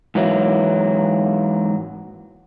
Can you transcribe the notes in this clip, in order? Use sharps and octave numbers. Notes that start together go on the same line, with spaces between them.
G#2 E3 F#3 A#3